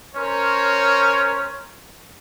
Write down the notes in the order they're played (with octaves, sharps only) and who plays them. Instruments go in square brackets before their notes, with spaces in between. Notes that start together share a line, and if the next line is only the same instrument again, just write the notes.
[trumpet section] C#4 A#4 C5 C#5